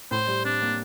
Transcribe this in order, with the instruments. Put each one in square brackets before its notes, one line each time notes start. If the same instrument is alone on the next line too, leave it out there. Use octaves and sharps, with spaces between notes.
[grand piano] A2 [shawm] C5
[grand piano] G3
[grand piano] C4 [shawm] D4
[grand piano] A#3